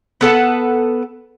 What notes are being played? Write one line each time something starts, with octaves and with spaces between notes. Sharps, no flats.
B3 A4 B4 F#5